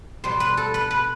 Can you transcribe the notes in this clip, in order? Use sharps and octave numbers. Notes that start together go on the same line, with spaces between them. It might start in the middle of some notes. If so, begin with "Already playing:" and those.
B2 G3 C5
B4
A4
B4
B4